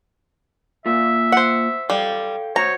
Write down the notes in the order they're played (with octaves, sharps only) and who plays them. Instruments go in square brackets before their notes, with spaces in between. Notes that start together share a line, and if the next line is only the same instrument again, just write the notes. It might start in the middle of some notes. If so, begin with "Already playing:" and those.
[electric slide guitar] A#3 F4 [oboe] E5
[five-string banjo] C5 F#5
[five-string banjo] G3 [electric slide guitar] A4 F5 G5
[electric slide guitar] F#4 C5 [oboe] C#5 [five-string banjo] A#5